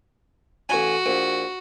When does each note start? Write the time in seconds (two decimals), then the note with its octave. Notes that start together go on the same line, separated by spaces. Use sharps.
0.69 A1 F#4 G#5
1.06 A#1